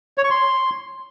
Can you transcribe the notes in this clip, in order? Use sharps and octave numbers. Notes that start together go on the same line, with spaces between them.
C#5
C#6
C6